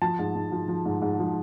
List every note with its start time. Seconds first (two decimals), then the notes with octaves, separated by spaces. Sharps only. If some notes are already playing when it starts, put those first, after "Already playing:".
0.02 F3 A5
0.19 G#2
0.35 G#2
0.52 F3
0.68 F3
0.85 G#2
1.02 G#2
1.19 F3